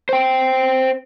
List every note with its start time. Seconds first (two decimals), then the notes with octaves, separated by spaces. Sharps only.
0.09 C5 G5